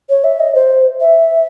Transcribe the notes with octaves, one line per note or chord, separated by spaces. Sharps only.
C#5
E5
D#5
C5
E5